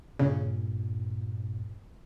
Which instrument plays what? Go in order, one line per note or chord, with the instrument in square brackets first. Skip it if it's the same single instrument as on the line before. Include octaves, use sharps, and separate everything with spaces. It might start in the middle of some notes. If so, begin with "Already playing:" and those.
[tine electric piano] G2 A#2 [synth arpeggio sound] C#3